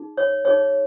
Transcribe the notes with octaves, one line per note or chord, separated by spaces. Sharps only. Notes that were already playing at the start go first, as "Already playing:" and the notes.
Already playing: D#4 G#4
C#5
D#4 G#4 C#5